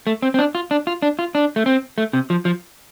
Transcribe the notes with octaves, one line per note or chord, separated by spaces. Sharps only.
A3
C4
C4
D4
F4
D4
F4
D4
F4
D4
A3
C4
A3
C3
F3
F3